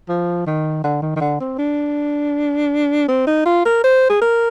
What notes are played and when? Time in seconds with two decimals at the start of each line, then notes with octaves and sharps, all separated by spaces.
0.09 F3
0.47 D#3
0.84 D3
1.02 D#3
1.16 D#3
1.21 D3
1.40 C4
1.58 D4
3.08 C4
3.27 D#4
3.46 F4
3.65 A#4
3.84 C5
4.10 G#4
4.21 A#4